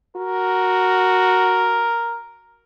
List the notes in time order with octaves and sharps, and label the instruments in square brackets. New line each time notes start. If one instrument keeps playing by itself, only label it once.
[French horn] F#4 [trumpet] A#4